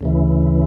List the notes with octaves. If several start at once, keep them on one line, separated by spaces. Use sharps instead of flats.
D2 C#3 E3